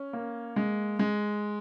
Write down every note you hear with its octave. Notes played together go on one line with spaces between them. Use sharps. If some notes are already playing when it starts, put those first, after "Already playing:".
Already playing: C#4
A#3
G#3
G#3